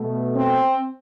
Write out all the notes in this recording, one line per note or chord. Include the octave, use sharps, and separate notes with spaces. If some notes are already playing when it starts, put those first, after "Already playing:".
Already playing: B2 A3
C4